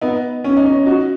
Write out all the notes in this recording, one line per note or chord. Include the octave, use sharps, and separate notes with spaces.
B3 D#4
C#4
D#4
C#4
D#4 F#4